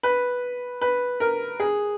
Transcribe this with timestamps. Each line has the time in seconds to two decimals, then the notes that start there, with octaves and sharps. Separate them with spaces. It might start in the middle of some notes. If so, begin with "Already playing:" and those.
0.03 B4
0.81 B4
1.20 A#4
1.60 G#4